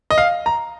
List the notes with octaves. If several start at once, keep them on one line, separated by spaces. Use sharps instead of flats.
D#5
F5
A#5